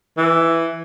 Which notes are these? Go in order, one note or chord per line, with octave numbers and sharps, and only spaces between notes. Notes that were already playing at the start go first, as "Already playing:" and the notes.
E3